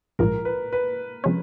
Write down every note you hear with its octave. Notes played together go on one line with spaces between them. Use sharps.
A#1 G#2 F3 G#3 A#4
B4
B4
C3 F3 G#3 C#4